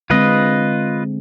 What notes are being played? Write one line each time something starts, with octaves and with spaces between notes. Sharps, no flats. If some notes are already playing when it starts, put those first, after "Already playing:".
D3 G#3 C4 F4 B4 D#5